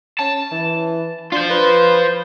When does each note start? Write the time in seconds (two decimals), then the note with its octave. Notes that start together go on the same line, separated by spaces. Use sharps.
0.19 C#4 A5
0.52 E3
1.32 D4 F4 C5
1.50 B4